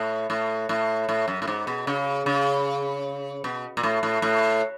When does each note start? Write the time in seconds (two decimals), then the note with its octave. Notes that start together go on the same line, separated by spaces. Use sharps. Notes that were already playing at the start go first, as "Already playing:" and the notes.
Already playing: A2
0.30 A2
0.69 A2
1.09 A2
1.28 F#2
1.42 A2
1.48 G#2
1.67 B2
1.87 C#3
2.26 C#3
3.44 B2
3.77 A#2
3.83 A2
4.03 A2
4.22 A2